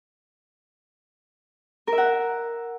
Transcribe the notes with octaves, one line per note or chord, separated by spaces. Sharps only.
A#4
E5
F#5